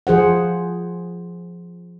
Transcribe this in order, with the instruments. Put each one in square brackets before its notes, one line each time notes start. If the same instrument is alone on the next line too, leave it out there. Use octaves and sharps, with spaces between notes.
[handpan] F3 G#4 C5 F#5